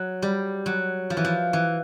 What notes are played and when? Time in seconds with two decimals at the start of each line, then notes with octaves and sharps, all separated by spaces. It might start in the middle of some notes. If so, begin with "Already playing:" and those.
Already playing: F#3
0.22 G3
0.66 F#3
1.10 F3
1.17 E3
1.25 F3
1.53 E3